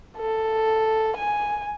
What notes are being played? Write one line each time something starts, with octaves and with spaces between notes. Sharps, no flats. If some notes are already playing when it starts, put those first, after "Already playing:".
A4
G#5